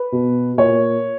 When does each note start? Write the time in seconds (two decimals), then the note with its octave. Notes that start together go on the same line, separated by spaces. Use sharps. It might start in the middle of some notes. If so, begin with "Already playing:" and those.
Already playing: B4
0.12 B2
0.58 A#2 C#5